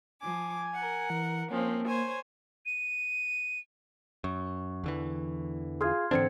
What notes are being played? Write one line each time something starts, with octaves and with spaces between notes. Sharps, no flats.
F3 G#5 D6
A#4 F#5
E3
F3 A#3 C4 C#4
C5 C#5 G#5
D#7
F#2 C#6
E2 D3 E3
F4 G#4 C6 F6 G#6
G#2 D3 E3 C4 D4 C5 G#6 C#7